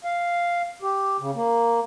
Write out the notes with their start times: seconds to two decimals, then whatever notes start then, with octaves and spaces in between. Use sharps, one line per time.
0.04 F5
0.82 G4
1.20 C#3
1.35 A#3